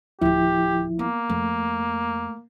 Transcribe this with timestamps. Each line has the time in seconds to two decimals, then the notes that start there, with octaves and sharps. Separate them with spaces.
0.21 D1 D2 D#3 F3 E4 G4
0.99 A#3 B3
1.29 F2 A3